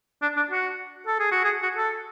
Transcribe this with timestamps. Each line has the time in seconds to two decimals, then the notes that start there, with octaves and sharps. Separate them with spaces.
0.22 D4
0.37 D4
0.51 F#4
1.07 A4
1.19 G#4
1.32 F#4
1.44 G#4
1.63 F#4
1.77 A4